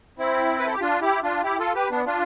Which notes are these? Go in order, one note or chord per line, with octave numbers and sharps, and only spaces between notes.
C4 E4
B4
A4
G4
D4 F4
E4 G4
D4 F4
E4 G4
F4 A4
G4 B4
B3 D4
D4 F4